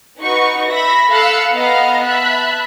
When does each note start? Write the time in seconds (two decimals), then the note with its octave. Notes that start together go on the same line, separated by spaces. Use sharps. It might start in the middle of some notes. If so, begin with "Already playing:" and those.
0.20 D#4 F#4 B4 C#6
0.68 E5 B5 A#6
1.10 A4 F5 B5 E6 F#6 C#7
1.53 B3 D#5 F5 A#5 F6
2.04 E5 A5 B5 F#6